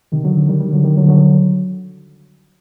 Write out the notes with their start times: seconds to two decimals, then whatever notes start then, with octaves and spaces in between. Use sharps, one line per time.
0.12 C3 D#3
0.24 D3 F#3
0.36 D3 F#3
0.48 D#3 G3
0.60 D#3 G3
0.72 D3 F#3
0.84 D#3 G3
0.97 D3 F#3
1.08 D3 F#3